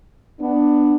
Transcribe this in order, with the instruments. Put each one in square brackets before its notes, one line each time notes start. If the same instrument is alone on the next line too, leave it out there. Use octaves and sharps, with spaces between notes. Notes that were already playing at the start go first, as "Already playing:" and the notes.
[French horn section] B3 D4